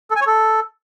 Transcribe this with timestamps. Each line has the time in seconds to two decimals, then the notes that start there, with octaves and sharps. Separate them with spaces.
0.11 A4
0.16 G#5
0.21 C#5
0.26 A4